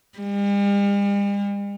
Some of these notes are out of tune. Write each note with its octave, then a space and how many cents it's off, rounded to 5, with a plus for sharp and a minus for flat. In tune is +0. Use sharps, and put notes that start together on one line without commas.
G3 +45